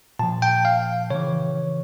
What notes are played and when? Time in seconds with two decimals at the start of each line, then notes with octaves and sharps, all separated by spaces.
0.19 A#2 F3 A5
0.42 G5
0.65 F5
1.10 C#3 E3 C#5